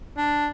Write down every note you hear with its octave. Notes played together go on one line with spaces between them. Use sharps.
D4